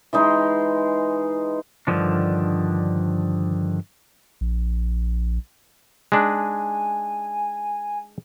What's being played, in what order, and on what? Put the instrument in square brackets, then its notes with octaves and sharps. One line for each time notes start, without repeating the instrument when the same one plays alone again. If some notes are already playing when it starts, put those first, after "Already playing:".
[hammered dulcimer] E3 G#3 D#4
[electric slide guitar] G2 A#2 D3 D#3 F3 D4
[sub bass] A#1
[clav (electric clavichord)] G#3 D4 D#4 [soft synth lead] G#5